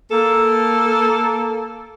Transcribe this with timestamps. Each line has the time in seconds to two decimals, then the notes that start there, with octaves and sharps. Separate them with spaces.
0.11 A#3 A4